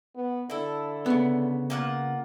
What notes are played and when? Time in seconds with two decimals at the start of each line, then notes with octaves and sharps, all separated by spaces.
0.15 B3
0.50 D3 E4 A4
1.06 C#3 B3
1.70 A#3 F4 F#5